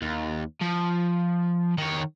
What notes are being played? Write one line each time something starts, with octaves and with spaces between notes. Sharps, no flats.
D#2
F3
D#3 C#5